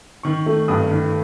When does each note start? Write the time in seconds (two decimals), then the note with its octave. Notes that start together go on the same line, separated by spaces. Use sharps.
0.23 D#3 C#6
0.46 A3
0.68 G2 D#6
0.91 D#3